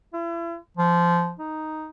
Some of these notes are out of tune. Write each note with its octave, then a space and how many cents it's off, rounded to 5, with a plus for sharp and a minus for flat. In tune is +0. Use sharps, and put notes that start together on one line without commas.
E4 +40
F3 -15
D#4 +0